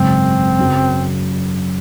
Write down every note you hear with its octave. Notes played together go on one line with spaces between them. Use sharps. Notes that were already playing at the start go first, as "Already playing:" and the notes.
Already playing: G#1 F#2 C#3 C4
F#2 C#3 F#3